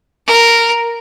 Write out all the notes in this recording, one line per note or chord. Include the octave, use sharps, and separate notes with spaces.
A#4